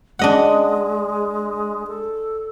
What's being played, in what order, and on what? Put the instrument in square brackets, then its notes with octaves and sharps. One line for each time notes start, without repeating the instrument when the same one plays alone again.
[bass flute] G#3 [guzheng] D4 D#5 F#5
[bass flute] A4